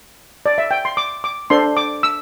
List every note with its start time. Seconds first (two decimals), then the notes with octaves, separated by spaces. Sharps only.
0.46 D5
0.58 E5
0.71 G5
0.85 C6
0.97 D6
1.24 D6
1.50 D4 A4 C5 C6
1.77 D6
2.03 E6